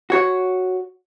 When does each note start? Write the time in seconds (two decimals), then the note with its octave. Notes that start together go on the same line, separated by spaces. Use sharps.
0.10 F#4 C#5